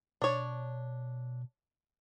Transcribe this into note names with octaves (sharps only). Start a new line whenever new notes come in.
B2 D4 C#5